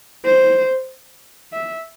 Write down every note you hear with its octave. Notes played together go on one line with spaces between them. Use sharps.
C5
E5